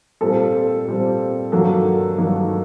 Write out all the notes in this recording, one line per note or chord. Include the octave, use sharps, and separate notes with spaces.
A#2 G3 C4 A4
A#2 G3 C4
G2 D#3 F#3 A#3 A4
G2 D#3 F#3 A#3